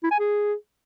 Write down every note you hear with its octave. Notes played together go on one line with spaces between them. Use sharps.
E4
G#5
G#4